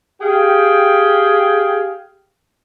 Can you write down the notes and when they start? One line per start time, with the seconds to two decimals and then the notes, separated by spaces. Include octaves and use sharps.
0.21 G4 G#4 F5 G5